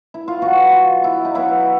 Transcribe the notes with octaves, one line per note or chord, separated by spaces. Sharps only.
E4
F4
B2 F#3 F#4
F4
E4
D#4
B2 F#3 E4